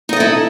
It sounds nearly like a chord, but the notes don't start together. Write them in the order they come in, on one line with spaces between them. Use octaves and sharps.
D#4 D#5 A4 E4